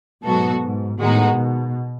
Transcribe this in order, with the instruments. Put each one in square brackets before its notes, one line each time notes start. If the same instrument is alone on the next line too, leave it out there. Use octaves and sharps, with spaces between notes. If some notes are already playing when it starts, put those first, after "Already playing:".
[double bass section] G#2 [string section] B2 F#3 B3 F#4 A4
[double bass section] G#2
[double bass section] A2 [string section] D#3 G#3 B3 D#4 F#4
[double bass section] B2